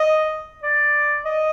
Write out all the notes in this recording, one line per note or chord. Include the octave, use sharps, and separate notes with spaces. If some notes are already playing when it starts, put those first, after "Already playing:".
Already playing: D#5
D5
D#5